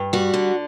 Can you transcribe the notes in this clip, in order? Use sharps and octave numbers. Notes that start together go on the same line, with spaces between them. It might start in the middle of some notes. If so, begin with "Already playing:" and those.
Already playing: G2
G3 F#4
D3